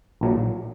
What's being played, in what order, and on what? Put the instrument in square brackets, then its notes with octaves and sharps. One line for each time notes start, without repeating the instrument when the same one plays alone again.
[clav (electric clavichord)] A#1 A#2 F#3